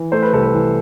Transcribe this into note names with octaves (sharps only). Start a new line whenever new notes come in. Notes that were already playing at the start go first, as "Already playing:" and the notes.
Already playing: E3
A3 C5
B4
C2 A4
B4
E3